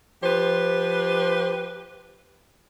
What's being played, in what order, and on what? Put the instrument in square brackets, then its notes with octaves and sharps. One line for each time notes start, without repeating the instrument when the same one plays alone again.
[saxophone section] F3 G4 B4 C5